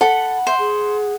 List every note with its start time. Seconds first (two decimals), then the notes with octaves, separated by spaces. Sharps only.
0.01 A4 F#5 B5
0.47 C5 E5
0.59 G#4